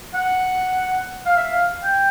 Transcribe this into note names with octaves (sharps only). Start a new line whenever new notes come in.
F#5
F5
E5
F5
G5